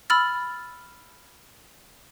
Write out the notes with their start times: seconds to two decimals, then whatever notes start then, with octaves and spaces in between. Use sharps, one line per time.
0.10 B5 E6 F6 A6